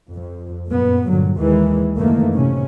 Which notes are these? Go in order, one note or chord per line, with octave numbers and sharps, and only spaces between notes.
F2
F#2 A#2 B3
G2 A#2 D3 F#3
D#2 D#3 E3 G#3
F#1 D#3 E3 A3 A#3
A2 C3 C#4